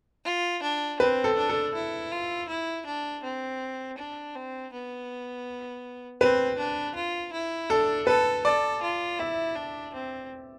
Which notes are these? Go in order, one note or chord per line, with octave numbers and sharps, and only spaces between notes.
F4
D4
C4 B4
A4
D4
A4
E4
F4
E4
D4
C4
D4
C4
B3
C4 B4
D4
F4
E4
D4 A4
A4 B4
A4 D5
F4
E4 E5
D4
C4